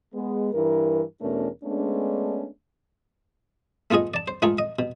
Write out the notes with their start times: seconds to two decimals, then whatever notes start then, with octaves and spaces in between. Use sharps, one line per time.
0.14 G#3 B3
0.53 G2 E3 E4 A#4
1.21 E2 B2 A3 C#4 D4 A#4
1.64 G#3 A3 B3 C#4 D4
3.91 A3 B3 F4 G#4 D#5
4.14 D5 A5
4.28 C5
4.42 G#2 A3 F4 G#4 A#4
4.58 D#5
4.79 B2